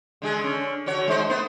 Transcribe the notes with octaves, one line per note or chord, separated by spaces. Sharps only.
D3 G#3 G#4
D3 C#4
D3 F#4 C#5
G#3 D#4 C5
A3 B3 C5